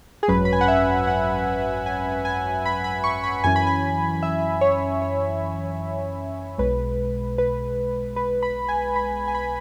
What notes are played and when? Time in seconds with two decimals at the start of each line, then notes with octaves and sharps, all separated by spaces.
0.23 G#4
0.28 G#1 F#2 F#3 C#4 B4
0.45 B5
0.53 G#5
0.61 F#5
0.68 E5
1.07 F#5
1.86 G#5
2.25 G#5
2.65 B5
2.84 B5
3.04 C#6
3.24 B5
3.44 F#2 E3 C#4 G#5
3.56 B5
3.67 G#5
4.23 E5
4.61 C#5
5.02 C#5
6.58 B1 B2 G#3 B4
7.38 B4
8.16 B4
8.43 B5
8.68 G#5
8.96 B5
9.28 G#5
9.35 B5